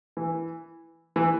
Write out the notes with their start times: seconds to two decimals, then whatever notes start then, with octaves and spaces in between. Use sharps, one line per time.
0.17 E3
1.16 E3